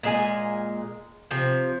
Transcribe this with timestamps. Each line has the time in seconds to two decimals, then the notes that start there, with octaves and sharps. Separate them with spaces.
0.03 A#2 G#3 G#5
1.31 C3 F3